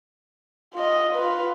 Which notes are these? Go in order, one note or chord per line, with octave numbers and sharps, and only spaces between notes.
F4 D#5
F4 B4